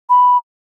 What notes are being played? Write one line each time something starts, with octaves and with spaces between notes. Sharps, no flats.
B5